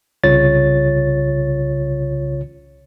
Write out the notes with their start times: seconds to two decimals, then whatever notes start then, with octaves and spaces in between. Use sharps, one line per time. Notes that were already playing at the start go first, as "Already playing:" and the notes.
0.24 C2 C#3 F4 C#5 A6